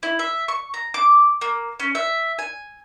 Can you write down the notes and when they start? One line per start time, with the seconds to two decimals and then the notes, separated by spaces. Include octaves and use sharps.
0.03 E4
0.19 E5
0.48 C#6
0.74 A#5
0.94 D6
1.41 A#3
1.80 C#4
1.95 E5
2.39 G#5